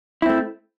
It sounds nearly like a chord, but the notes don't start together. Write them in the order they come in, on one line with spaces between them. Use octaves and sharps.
E4 C4 A3